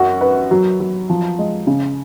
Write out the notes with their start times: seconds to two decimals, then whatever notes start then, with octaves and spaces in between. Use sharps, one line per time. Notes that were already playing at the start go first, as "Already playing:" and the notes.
Already playing: F#2 F#4
0.21 B4
0.51 F#3
0.80 F#3
1.10 F3
1.39 G#3
1.67 C#3